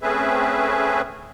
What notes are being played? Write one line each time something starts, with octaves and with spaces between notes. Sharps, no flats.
A3 C4 C#4 G#4 B4 E5